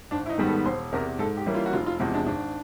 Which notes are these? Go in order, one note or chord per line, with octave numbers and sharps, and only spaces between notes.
G#1 D4
E4
D#4
G#2 D#3 G3 B3
A4
E1 C5
E2 C3 A#4
G#2 A4
G4
E3 G3 A#3 C#4
F4
F#4
F1 F4
F4
E2 C3 F3 G#3 E4
D4
G#1 D4